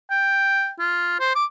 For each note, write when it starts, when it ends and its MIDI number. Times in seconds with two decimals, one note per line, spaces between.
0.11 0.71 79
0.79 1.18 65
1.20 1.35 72
1.35 1.45 86